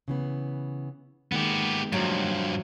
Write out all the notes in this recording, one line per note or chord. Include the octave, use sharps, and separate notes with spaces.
C#3 E3 B3
D#3 G#3 A#3 B3 G4
G2 F3 F#3